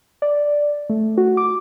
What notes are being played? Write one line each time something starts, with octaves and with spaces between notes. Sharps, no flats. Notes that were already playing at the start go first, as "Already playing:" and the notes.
D5
A3
F#4
D6